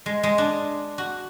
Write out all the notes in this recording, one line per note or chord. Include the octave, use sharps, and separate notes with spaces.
G#3
G#3
D4
F#4